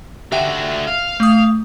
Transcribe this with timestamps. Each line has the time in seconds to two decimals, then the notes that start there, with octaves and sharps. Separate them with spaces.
0.32 D3 F#4 G4 E5 G5
0.87 F5
1.20 A3 D#6